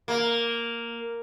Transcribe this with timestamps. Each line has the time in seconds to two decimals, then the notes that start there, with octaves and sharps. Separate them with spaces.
0.08 A#3